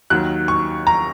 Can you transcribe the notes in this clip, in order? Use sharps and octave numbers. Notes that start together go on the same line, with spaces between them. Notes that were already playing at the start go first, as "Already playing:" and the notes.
D#2 D#3 F#3 F#6
C#6
A#5